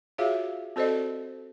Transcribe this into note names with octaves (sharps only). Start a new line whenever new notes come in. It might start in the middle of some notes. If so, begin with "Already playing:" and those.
F4 F#4 G#4 C#5 E5 F5
C4 F#4 A4 C5 D5 D#5